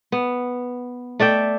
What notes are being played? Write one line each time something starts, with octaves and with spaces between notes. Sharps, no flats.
B3
A3 D5 E5 G5